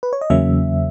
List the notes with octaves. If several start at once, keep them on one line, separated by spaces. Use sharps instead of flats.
B4
C#5
D#5
E2 C#3 F#3 A#3 C#4 E5